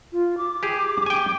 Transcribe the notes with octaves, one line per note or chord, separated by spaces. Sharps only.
F4
D6
G4 G#4
G5 G#5